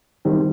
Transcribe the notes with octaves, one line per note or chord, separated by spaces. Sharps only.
D#3 G3 C4